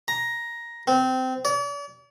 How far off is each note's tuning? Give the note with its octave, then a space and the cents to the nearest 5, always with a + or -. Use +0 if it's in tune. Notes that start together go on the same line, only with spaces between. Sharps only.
A#5 +10
C4 -20
D5 -45